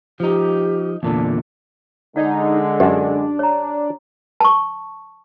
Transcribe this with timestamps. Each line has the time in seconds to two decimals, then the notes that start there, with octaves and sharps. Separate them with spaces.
0.20 F3 D#4 G4
1.03 E2 A#2 D3 A5
2.16 D3 G#3 D#4 D5 F#5
2.80 F#2 D4 G4 D5
3.39 C#5 A#5
4.40 A5 C#6